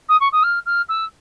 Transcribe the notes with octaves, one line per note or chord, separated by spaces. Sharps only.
D#6
C#6
D#6
F6
F6
E6